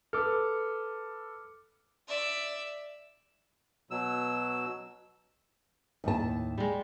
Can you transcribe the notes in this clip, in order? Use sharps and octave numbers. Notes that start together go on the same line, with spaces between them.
A4 B4 D6 F6
D5 E5
B2 F#3 E6
D#2 A2 A5
G3 G#3